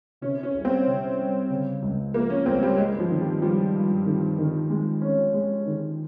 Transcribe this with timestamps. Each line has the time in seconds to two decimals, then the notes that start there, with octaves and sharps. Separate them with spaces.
0.21 C3 C#4
0.43 C#4
0.53 C2
0.65 C4
0.86 C3
1.19 G3
1.50 C#3
1.82 C#2
2.14 F3 A#3
2.30 C#4
2.46 C#2 C4
2.63 G3
2.78 G2 G#3
3.00 F3
3.10 D#3
3.21 G3
3.42 F3 G3
3.74 G2
4.06 D#3
4.39 D#3
4.70 G#3
5.02 C#4
5.34 G#3
5.66 D#3